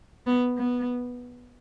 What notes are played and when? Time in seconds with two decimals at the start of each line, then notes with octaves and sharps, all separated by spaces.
0.27 B3
0.57 B3